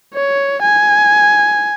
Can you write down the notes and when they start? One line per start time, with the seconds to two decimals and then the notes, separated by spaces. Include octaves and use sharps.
0.14 C#5
0.62 G#5